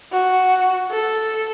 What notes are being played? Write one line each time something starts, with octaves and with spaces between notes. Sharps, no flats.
F#4
A4